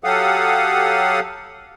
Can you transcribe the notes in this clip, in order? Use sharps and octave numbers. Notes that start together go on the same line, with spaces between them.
F#3 G4 A4 F5 F#5 D#6